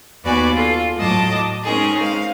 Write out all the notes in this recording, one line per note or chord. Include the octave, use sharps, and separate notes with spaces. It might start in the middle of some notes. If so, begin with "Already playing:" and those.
D#2 B3 F#4 B4 D5 G#5
F4 A4
A2 F#3 D#5 A5 D6
G#3 C4 C#4 D#4 G#4 A#4
G#3 F5